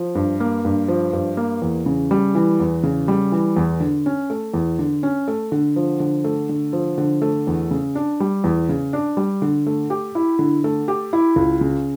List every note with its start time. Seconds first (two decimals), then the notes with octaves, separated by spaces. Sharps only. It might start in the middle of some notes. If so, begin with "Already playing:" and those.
Already playing: F3
0.15 G2
0.40 A#3
0.65 G2
0.88 F3
1.13 G2
1.37 A#3
1.62 E2
1.86 C#3
2.11 G3
2.35 E3
2.60 E2
2.83 C#3
3.08 G3
3.32 E3
3.57 E2
3.80 D3
4.06 C#4
4.30 A3
4.54 E2
4.79 D3
5.03 C#4
5.28 A3
5.52 D3
5.76 F3
6.00 D3
6.24 A3
6.49 D3
6.73 F3
6.98 D3
7.22 A3
7.47 E2
7.71 C#3
7.95 D4
8.20 G3
8.44 E2
8.69 C#3
8.93 D4
9.17 G3
9.42 D3
9.67 A3
9.90 G4
10.15 E4
10.39 D3
10.64 A3
10.88 G4
11.13 E4
11.36 C#2
11.61 C#3